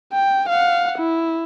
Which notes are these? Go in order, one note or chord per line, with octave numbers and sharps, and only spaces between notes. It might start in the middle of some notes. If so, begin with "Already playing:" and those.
G5
F5 F#5
E4